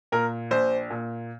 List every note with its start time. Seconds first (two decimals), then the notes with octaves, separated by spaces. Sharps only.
0.12 A#2 A#4
0.51 A#1 C5
0.90 A#2